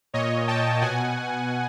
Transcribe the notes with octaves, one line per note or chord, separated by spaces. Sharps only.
A#2 C#5 D#5
G5 A5
B2 F#5 G#5